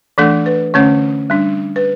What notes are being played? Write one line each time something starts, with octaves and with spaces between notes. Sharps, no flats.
E3 A3 D4 A4
B4
D3 A3 C#4 C#5
G3 D4
B4